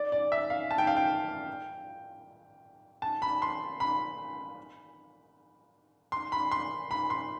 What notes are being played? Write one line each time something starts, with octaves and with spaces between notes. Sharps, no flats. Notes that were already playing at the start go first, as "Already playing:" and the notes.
Already playing: D5
D5
E5
F5
A5
G5
F5
G5
A5
B5
C6
B5
C6
B5
C6
B5
C6